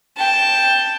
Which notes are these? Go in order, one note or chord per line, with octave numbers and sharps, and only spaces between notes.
G5 A5